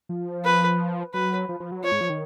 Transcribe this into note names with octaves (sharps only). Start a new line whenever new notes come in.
F3
B4
F#3 B4
F3
F3
F#3
F3 C#5
G#2
F3
D#3